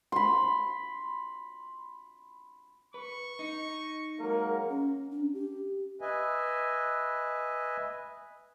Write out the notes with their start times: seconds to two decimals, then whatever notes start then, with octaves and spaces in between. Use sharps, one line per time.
0.12 B5 C6
2.94 B4 C#6
3.39 D#4
4.20 F#3 G#3 A#3 A#4
4.70 C#4
5.11 D4
5.34 G4
6.01 B4 D#5 E5 G#5